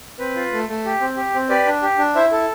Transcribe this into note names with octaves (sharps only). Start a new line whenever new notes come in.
C4 B4
F4
A3
A3
G4
C4
G4
C4
G4 B4 D5
D4
G4
D4
E4 C5 E5
A4